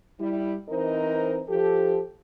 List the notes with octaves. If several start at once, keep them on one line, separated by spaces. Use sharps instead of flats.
G3 E4
E3 C4 D#4 A#4 C5 D#5
F3 G4 A4